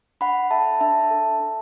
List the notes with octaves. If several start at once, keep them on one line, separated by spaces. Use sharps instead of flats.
D4 F#5 B5
A4 E5 A5
D4 E5 A5
A4
D4